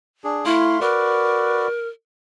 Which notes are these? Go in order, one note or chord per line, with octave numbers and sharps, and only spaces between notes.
D4 G#4
A3 E4 F5 C6
F#4 A#4 B4 D5